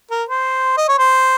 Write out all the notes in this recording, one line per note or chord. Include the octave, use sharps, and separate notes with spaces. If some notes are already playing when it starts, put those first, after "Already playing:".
A#4
C5
D#5
C#5
C5